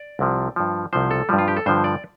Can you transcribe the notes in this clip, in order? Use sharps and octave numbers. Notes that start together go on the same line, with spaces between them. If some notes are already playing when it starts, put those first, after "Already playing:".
Already playing: D5
C2 C3 F3
G2 F3
C2 C3 F3 C5
A4
G2 F3 G3
F4
G4
A4
G2 D3 F3 C5
D5